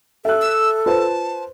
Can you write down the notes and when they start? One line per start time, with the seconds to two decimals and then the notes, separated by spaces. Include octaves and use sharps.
0.25 A4 E5 F#6
0.41 E6
0.86 F4 B4 C5 A5